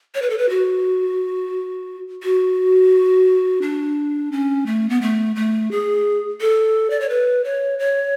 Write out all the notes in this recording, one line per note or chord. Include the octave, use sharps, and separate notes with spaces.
C#5
B4
A4
B4
F#4
F#4
D4
C#4
A3
B3
A3
A3
G#4
A4
D5
C#5
B4
C#5
C#5